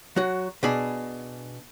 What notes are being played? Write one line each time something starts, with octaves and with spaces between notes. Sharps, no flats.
F#3 F#4
B2 D4 G#4 B5